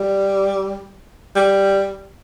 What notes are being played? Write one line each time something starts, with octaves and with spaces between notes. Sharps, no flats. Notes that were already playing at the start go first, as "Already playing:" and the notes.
Already playing: G3
G3